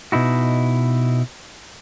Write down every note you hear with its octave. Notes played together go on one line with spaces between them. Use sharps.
B2 D#4 E4 F#4